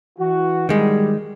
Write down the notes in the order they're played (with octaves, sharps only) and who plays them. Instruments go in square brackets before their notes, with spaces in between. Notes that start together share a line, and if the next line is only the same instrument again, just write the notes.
[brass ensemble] E3 F#4
[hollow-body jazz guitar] D#3 G#3 [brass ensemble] G3